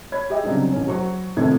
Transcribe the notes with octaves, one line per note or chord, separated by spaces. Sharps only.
C#5 B5 G#6
G4 G#4 D#5 E5 G5
C#3 F#3 G3 C4 D4 D#4
A1 C#4
F#3 F#4 C5 C#6
G#1 F2 A2 C3 B3 G#6